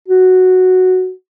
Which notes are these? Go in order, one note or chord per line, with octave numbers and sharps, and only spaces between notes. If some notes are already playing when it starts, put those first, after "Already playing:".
F#4